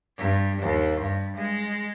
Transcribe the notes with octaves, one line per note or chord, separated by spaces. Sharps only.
G2
D#2
G2
G#3